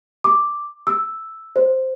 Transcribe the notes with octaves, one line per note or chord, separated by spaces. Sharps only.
D6
E6
C5